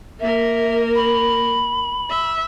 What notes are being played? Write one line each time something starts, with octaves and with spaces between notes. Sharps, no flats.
A#3 A#4 E5
B5
E5